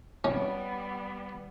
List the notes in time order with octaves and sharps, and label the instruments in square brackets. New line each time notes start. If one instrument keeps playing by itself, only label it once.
[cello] G3 B3 [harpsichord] C#4